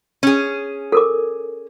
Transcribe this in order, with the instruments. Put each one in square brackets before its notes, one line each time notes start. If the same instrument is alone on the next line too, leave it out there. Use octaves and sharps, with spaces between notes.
[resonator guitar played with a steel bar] C#4 G#4
[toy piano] A4 A#4 D6